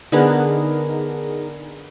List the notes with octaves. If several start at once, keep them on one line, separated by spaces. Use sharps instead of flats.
D3 B3 D4 D#4 G#4 A#4